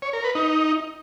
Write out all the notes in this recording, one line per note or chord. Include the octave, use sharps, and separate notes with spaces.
C#5
A#4
B4
D#4